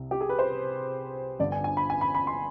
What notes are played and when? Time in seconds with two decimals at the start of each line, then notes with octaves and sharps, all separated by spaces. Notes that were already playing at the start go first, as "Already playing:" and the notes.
Already playing: C2 C3
0.11 G4
0.21 G#4
0.29 B4
0.39 C5
1.39 G1 G2 D3 D5
1.52 G#5
1.64 G#5
1.77 B5
1.90 G#5
2.01 B5
2.15 B5
2.27 C6